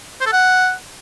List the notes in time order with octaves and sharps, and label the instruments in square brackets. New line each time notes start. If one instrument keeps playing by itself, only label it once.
[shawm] C5
A4
F#5